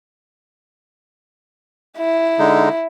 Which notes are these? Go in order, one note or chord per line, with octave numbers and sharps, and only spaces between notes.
E4
D3 G#3 D#4